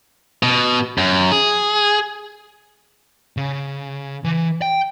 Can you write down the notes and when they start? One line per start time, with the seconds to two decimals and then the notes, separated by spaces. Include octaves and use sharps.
0.43 B2
0.98 F#2
1.32 G#4
3.37 C#3
4.24 E3
4.62 G5